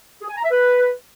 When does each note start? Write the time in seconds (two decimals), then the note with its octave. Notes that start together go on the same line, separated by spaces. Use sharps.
0.22 G#4
0.29 G#5
0.36 A#5
0.44 E5
0.51 B4